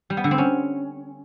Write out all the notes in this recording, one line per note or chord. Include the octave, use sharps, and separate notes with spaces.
G3
B3
D3
C4
C#4